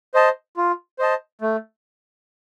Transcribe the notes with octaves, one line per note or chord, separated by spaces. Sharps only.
C5 D#5 A5
F4
C5 D#5 A5
A3